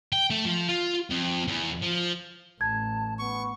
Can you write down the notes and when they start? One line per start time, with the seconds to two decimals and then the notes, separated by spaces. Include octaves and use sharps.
0.13 G5
0.30 A3
0.45 F3
0.69 F4
1.10 F2
1.47 E2
1.82 F3
2.61 A1 A5 G#6
3.19 B3 C#6